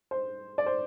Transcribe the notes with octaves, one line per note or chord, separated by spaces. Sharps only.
C5
D5
C5